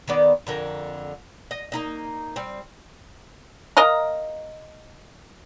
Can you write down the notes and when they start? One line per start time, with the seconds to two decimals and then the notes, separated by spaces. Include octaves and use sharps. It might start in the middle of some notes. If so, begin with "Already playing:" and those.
0.08 D#3 B3 D5
0.47 F2 D3 A#4
1.51 D#5
1.72 A#3 D#4 D#5
2.36 G3 C4
3.77 A#4 D#5 F5 A#5